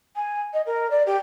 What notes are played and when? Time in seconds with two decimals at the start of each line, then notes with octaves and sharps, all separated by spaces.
0.16 G#5
0.53 D#5
0.66 A#4
0.91 D5
1.06 G4